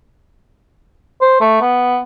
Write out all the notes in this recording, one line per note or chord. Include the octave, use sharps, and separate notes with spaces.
C5
A3
B3